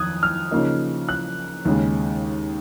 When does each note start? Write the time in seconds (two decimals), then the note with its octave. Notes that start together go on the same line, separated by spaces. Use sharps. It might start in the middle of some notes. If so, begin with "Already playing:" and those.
Already playing: F2 D#3 D#6 F#6 G#6
0.23 F6
0.51 C#3 F3 A#3 D#4
1.09 F#6
1.65 D#2 C#3 G#3